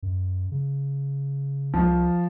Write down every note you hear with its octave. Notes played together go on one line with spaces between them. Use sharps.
F#2
C#3
C2 F3